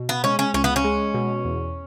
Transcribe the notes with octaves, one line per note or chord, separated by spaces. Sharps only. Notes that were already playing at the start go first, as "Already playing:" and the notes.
Already playing: B2
B3
G#3 C#4
C#4
C#2 C#4
B3
C#4
G#3
B2
E2